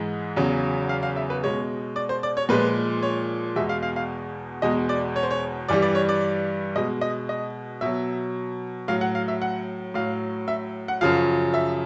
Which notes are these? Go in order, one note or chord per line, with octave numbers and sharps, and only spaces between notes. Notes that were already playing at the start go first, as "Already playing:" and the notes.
Already playing: G#2 E3 G#3
E2 C#3 F#3
F5
F5
E5
B4
B2 G#3 C#5
D5
C5
D5
C#5
A#2 F3 G#3 B4
C#5
E2 B2 G#3 E5
F5
F5
F5
E2 B2 G#3 D#5
D5
C#5
C5
C#5
G2 E3 G3 D5
D5
C#5
D5
B2 G#3 D#5
D#5
D#5
B2 F#3 E5
A2 F#3 F5
F#5
F5
E5
F#5
A2 F#3 F5
E5
F#5
F#2 C#3 F3 F5
E5